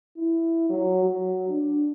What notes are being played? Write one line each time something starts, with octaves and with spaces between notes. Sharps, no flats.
E4
F#3
F#3
D4